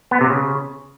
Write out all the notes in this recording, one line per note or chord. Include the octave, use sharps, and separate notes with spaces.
B3
C3
C#3